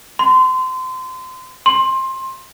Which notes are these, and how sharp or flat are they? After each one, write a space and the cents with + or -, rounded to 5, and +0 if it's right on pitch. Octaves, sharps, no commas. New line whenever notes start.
C6 -25
C6 +20